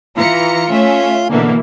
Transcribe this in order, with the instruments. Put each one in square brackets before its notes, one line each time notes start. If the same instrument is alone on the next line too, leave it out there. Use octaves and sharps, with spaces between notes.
[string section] E3 A#5 C#7 [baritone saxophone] F4
[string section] A3 C#4 E5
[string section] B2 E3 A#3 [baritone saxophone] D3